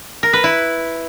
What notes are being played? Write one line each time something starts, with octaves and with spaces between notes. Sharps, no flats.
A#4
B4
E4